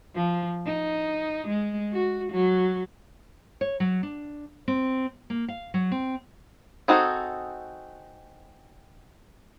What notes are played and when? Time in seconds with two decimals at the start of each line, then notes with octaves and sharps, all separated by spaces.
0.15 F3
0.66 D#4
1.48 G#3
1.93 F#4
2.32 F#3
3.61 C#5
3.80 F#3
4.03 D4
4.68 C4
5.30 A#3
5.48 F5
5.74 F#3
5.92 C4
6.88 C4 D#4 F#4 G#4 A4